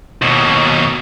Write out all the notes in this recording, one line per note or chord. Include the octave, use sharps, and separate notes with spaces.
D#2 B2